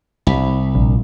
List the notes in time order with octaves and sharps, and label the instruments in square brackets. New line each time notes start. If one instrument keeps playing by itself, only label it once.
[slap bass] C2 [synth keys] B5
[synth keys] A#1